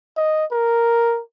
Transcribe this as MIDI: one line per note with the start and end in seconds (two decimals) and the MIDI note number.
0.17 0.45 75
0.52 1.21 70